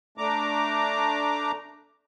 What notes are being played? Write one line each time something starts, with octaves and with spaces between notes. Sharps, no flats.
A3 D4 A#5 D6